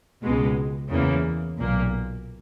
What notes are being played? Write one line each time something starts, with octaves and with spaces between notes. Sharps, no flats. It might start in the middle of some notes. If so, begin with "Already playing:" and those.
C#2 B2 G#3
E2 C#3 E3 A#3
B1 A#2 A#3